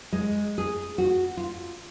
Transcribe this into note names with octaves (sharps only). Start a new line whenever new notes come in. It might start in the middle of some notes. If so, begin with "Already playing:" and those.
G#3
G#4
F#4
F4